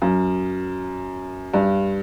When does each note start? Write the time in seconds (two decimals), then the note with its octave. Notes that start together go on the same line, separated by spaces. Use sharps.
0.02 F#2
1.54 G2